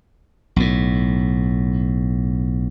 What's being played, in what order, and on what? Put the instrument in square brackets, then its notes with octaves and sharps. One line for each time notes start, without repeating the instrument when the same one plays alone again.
[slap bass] B1 A2